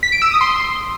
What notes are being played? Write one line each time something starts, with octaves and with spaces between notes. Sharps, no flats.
B6
D7
E6
D#6
C6